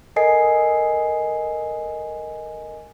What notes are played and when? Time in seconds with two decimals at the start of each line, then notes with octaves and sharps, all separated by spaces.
0.16 A4 A#4 D#5 G#5 C7